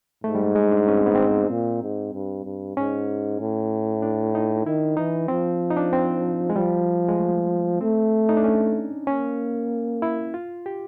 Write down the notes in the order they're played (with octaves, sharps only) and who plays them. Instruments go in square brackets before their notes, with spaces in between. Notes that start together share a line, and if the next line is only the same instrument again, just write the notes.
[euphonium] G#2 [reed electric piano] A3
[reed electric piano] G3
G#3
G#3
D4
C#4
C4
B3
C4
[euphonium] A#2
G#2
G2
G2
[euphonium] G#2 [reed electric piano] C#4
[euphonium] A2
[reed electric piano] D4
D#4
[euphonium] D#3 [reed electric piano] E4
[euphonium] E3 [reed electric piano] D#4
[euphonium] F3 [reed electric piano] C4
[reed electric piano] D#4
D4
C4
G#3
[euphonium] F3 [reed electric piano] G3
[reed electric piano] G#3
A3
[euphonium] A3 [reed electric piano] C4
[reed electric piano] D#4
D4
C#4
[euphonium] A#3 [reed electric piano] C#4
[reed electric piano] E4
F4
G4